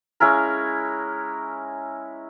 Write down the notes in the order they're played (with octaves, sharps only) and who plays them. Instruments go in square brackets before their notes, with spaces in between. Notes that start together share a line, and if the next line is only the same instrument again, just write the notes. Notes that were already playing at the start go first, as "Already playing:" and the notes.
[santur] G#3 C#4 E4 A#4